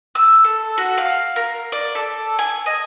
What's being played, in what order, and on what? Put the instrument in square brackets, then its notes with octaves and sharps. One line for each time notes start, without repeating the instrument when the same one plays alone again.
[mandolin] E6
A4
F#4
F5
A#4
D5
A4
G#5
D#5